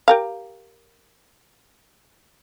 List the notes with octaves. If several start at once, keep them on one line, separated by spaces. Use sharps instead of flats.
G4 A#4 F5